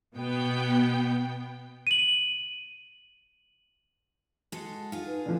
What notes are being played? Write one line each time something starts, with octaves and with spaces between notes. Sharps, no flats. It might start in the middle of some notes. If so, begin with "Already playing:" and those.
B2 B3 G5
D#7 F#7
G#3 F#4 A4
D#4 F4 G#4
B4
D3 E3 F3